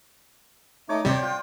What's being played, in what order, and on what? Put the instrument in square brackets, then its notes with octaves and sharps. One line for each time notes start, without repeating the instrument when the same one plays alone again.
[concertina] A3 D#4 D6 [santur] C#5
[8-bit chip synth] C3 G3 [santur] C5 D5 [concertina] G5
[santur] F4 [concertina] G5